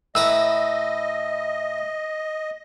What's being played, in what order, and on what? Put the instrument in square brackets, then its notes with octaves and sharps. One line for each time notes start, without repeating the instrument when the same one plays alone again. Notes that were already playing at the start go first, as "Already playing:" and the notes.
[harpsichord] A2 B4 A#5 [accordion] D#5 [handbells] E6